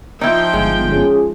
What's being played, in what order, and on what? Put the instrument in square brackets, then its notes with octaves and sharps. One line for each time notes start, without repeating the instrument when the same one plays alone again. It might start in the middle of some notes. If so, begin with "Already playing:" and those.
[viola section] F3 G5 [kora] D#4 E4
[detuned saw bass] G1 [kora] G#3
[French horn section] C#4 F4 G#4